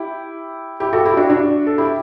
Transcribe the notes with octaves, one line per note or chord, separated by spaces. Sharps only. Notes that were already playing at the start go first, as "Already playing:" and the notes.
Already playing: E4 G4
E4 G4
F#4 A4
E4 G4
D4 F#4
D4 F#4
A4
E4 G4